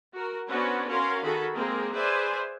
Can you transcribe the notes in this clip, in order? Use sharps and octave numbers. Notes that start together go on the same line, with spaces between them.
F#4 A#4
B3 C#4 D4 F#4 B4 C5
C#4 F#4 A#4 F5 C6
D#3 F#4 G#4 A4 B5
G#3 A#3 C4 G#4 A#4
G#4 B4 C5 D5 E5 G#5